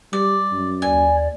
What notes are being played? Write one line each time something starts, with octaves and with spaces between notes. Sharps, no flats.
G3 D5
F#2
D#2 D5 G#5